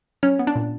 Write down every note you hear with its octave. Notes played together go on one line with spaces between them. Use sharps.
F#3 C#4 C#5
B3
D4 D5
A#2